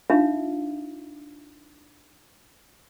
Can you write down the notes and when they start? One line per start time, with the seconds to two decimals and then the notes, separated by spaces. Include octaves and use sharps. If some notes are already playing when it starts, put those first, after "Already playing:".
0.10 D4 D#4 F4 E5 F5